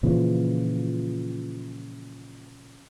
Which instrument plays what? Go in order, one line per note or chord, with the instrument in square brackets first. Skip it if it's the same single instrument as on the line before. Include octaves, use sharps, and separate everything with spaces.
[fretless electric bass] A#2 C#3 E3 F3